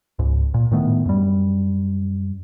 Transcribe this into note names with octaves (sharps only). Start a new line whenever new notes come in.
C#2 G#2
A#2
A2 D#3 A3 B3
F#2 G3